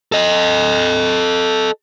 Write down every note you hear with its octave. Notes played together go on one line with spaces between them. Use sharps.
A4 D#5